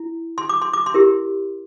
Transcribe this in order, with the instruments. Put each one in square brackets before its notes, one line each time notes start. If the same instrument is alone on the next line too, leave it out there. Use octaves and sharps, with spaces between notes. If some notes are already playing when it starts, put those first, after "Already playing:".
Already playing: [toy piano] E4
C6
D6
C6
D6
C6
E4 G4 A#4